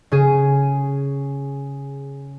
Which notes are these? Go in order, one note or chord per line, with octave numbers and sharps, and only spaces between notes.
C#3 G#4